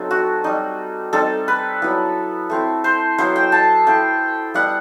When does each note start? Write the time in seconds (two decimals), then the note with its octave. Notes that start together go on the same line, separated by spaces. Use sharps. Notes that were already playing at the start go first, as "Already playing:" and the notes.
Already playing: F#3 A3 C4 D#4 A4
0.11 F#4
0.44 G3 D#4
1.13 G3 C4 D#4 A4
1.48 B4
1.82 F#3 B3 E4
2.50 A3 C4 E4
2.84 C5
3.18 F#3 B3 E4 C5
3.36 G5
3.52 A5
3.86 A3 E4 G5
4.54 G3 B3 E4 F#5